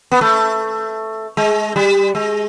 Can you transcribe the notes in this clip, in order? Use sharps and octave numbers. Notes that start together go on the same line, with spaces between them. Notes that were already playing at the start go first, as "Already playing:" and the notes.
B3
A3
G#3
G3
G#3